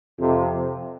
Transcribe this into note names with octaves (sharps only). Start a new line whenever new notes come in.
F2 C3